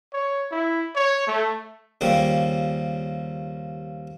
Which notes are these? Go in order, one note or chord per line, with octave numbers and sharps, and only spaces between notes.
C#5
E4
C#5
A3
D#2 C#3 F3 G3